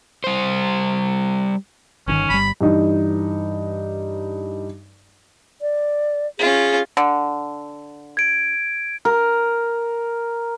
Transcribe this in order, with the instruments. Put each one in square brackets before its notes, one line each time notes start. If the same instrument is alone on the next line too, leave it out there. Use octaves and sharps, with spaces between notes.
[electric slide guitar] G3 C5
[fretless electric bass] G1 D3 D#3 [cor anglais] C#4
[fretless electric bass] G1 G3 [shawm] B5
[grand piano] G2 E3 D#4
[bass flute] D5
[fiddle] C#4 F4 [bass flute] G#4
[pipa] D3
[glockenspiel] G#6 D7
[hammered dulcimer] A#4